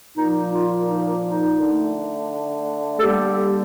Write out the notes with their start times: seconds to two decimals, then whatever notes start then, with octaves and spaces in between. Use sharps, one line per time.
0.17 A#2 F3 A#3 D#4
0.53 F4
0.89 D#4
1.25 D#4
1.60 D3 A3
2.99 A4
3.03 D3 G3 A#3 G4